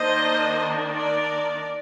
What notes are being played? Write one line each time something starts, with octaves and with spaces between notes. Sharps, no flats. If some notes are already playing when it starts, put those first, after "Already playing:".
Already playing: D#3 A#3 D4 C5 D#5
A#4 D5